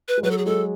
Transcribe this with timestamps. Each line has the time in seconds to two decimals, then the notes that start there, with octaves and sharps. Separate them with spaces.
0.08 B4
0.17 G#3
0.23 F#3 B4
0.31 A4
0.38 G#4
0.46 G#3 A4